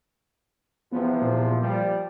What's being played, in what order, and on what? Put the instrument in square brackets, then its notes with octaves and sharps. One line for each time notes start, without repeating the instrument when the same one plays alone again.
[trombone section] E2 C3 F3 [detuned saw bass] B3
[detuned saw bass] A#2
[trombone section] F3 G3